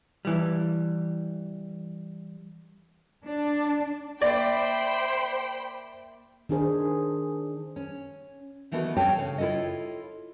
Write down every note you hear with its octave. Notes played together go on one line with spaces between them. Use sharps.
E3 G3
D4
A#3 C5 D5 E5 G5 B5
D#3 D4 G#4 C5
C#4
D#3 E3 A3 B3 E4 F#4
C4 C#4 A4 C#5 G5 A5
C#3
E4 F4 A4 C#5 D#5